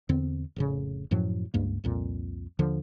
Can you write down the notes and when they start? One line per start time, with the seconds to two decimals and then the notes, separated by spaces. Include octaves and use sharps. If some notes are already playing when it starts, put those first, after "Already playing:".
0.09 E2 D3 C4
0.56 F1 A2 C#3
1.11 F#2 A2 F3 F#3
1.54 C#2 G2 A#3
1.84 C2 F2 A#2
2.59 D#2 D3 F3